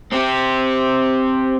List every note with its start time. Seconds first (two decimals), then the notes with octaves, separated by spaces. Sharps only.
0.13 C4 G4